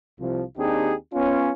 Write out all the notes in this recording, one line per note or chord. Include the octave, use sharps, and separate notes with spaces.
C2 F3
D#2 C4 D4 D#4 G4 G#4
B3 C#4 F4